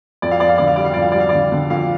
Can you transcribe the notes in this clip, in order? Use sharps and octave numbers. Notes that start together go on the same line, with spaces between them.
F2 D5
F5
F2 D5
F5
D3 D5
F5
G3 D5
F5
F2 D5
F5
G3 D5
F5
D3 D5
D3
F2 F5